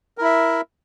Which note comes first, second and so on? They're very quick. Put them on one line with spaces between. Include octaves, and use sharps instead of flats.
A#4 E4 E5